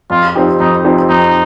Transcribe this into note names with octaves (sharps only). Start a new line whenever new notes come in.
F2 F4
F3 C4 D#4 G4
F2 D#4
F3 C4 D#4 G4
F2 D#4